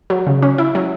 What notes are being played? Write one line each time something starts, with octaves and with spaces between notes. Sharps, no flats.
F#3
C#3
C#4
E4
F#3